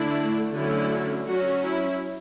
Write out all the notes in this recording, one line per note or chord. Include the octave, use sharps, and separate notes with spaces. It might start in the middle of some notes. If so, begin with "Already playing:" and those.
Already playing: D3 A3 D4 E4
D3 F#3 A3 C#4 E4
F#3 C#4 F#4
E4